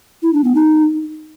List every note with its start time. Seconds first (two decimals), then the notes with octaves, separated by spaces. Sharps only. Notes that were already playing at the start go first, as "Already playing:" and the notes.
0.23 E4
0.33 D4
0.44 B3
0.55 D#4